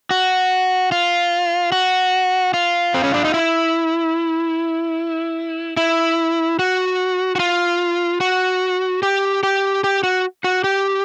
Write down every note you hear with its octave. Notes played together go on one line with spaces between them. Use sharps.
F#4
F4
F#4
F4
C4
C#4
D4
D#4
E4
E4
F#4
F#4
F4
F#4
G4
G4
G4
F#4
F#4
G4